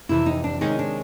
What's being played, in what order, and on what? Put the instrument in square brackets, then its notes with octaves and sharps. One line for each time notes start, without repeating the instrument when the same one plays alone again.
[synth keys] F2 C3 E3 [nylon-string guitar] E4
[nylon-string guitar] D#4
D4
[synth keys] C3 D#3 G#3 C#4 [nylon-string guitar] D#4
[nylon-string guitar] D4